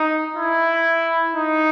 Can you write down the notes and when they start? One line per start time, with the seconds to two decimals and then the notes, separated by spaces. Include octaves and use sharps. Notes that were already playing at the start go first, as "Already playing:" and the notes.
Already playing: D#4
0.37 E4
1.36 D#4